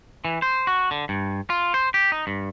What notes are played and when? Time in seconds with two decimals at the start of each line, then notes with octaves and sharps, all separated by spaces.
0.25 E3
0.42 C5
0.67 F#4
0.91 D3
1.09 G2
1.50 F4
1.74 C5
1.94 G4
2.12 D#4
2.27 G2